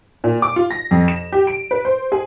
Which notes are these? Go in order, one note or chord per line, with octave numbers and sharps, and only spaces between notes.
A#2
D6
F4
A#6
F2
E7
G4
D7
B4
C5
G#4